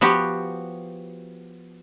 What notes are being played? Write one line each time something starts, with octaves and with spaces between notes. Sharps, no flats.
F3 B3 F#4 G4